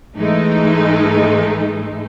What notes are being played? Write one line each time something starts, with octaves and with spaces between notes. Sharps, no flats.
G#2 E3 G#3 A3 D#4